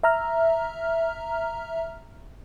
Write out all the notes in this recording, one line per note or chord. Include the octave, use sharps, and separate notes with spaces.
E5 A#5 F6